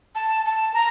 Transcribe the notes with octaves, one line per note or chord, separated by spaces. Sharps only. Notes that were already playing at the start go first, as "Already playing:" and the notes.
A5
A5
A#5